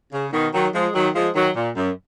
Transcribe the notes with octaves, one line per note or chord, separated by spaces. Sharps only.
C#3
B2 D#3
D#3 F#3
F3 G#3
D#3 F#3
F3 G#3
D#3 F#3
A#2
F#2